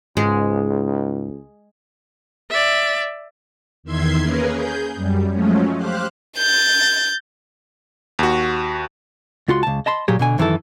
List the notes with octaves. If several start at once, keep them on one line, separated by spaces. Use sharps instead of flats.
C#2 G#2 G#3
D5 E5
E2 D#3 E5 C6 G#6 C7
A#3 C#4 G#4 A#4 B4
G#4 G6
F#2 G3
F3 F#3 G#3 A3 C#4
G4 C5 F5 F#6
G6 A6
D#2 F#4
C#2 F4 F#4 C6
C#2 A5
D#5 A5 B5 C6
A#2 F#3 G4 G#4
B2 D3 G#5
F#2 D#3 E3 D#4 E4 A4